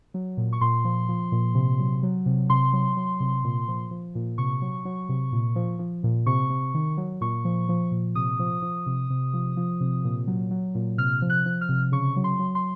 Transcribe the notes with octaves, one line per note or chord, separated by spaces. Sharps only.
F#3
A#2
C#6
A#2 C6
F3
F3
A#2
C3
F#3
F#3
C3
C3 C6
F#3
F#3
C3
A#2
F3
F3
A#2
C3 C#6
F#3
F#3
C3
A#2
F3
F3
A#2
C3 C#6
C3
D#3
F#3
A#2 C#6
F3
F3
A#2
C3 D#6
F3
F3
C3
C3
F3
F3
C3
A#2
F#3
F#3
A#2
C3 F6
F3
F#6
F3
F6
C3
C#3 C#6
F#3
C6
F#3
C6